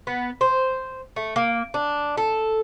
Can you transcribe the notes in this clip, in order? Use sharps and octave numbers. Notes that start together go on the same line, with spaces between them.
B3
C5
A3
A#3
D4
A4